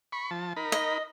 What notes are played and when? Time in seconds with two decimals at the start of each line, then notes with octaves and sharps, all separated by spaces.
0.12 B5 C#6
0.31 F3 A5
0.56 D#4 A#4 B5
0.72 D#5